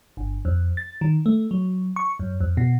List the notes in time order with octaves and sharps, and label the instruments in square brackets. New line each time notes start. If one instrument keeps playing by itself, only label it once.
[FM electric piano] G1
F2
A6
D#3
A3
F#3
C#6
F#2
F2
B2